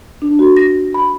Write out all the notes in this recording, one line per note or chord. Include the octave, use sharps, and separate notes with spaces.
D4
F#4
A#6
B5